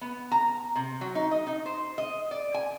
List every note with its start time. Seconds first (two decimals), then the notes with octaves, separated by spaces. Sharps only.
0.01 B3
0.32 A#5
0.76 C3
1.01 F#3
1.15 D#4
1.31 D#5
1.47 D#4
1.66 C5
1.98 D#5
2.31 D5
2.54 G#5